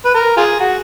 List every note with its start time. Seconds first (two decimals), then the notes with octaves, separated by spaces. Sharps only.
0.05 B4
0.14 A#4
0.37 F4 G#4
0.60 F#4